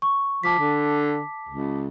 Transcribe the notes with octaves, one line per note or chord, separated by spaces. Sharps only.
C#6
F3 A5 D6 B6
D3
C#2